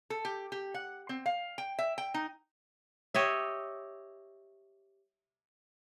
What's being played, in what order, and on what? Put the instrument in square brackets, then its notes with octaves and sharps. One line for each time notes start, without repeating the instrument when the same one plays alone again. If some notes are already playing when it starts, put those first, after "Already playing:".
[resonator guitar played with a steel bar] A4
G4
G4
F#5
C4
F5
G5
E5
G5
D#4
[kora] G4 C#5 D#5 E5